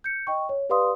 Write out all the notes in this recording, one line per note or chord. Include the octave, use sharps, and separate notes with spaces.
G6 C#7
D#5 G5 C#6
C#5
G4 B4 D5 F5 C6 D#6